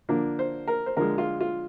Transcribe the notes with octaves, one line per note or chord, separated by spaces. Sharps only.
D3 F3 A#3 D4
C5
A#4
C5
D3 F3 G#3 A#4
F4
F4